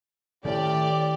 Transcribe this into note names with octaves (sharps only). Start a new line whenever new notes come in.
A2 D#3 G4 D5